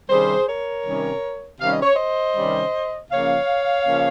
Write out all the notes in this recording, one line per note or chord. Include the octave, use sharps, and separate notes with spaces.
C3 D#3 G3 C#4 G#4 C5
A#4 C#5
C3 D#3 G3 C#4
C3 D#3 G3 C#4 F5
D#5
C#5
C5 D#5
C3 D#3 G3 C#4
C#3 F3 A#3 C#4 C#5 F5
C#3 F3 A#3 C#4